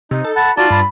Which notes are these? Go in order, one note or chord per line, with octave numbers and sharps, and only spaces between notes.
C3 D#4
A4
F#5 A5 B5
D#4 F4 F#4 D5 A5
G2 B5